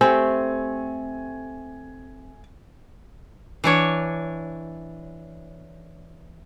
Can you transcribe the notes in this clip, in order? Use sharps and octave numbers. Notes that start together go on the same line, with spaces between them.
A3 C4 G4 G#5
E3 D4 C#5